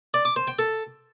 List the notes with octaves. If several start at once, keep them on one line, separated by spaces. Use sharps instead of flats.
D5
D6
C5
G5
A4